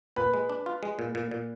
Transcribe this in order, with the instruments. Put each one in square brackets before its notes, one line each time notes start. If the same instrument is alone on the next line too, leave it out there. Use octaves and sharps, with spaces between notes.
[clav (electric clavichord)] A#2 [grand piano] B4 B5
[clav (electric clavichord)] G#3
D4
F4
G#3
A#2
A#2
A#2